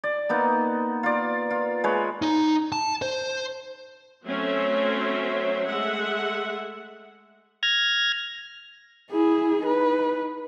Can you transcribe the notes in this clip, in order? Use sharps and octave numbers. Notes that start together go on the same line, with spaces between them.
D5
A#3 B3 D#4
F4 D5
F4
G#3 B4 C#5
D#4
A5
C5
F#3 A3 C4 C#4 C5 E5
G#3 A3 E5 F#5
F6 G#6 A#6
E4 G#4
D#4 B4